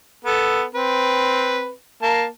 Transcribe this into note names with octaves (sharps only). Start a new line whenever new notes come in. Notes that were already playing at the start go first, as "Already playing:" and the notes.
B3 A4
C4 B4
A#3 A5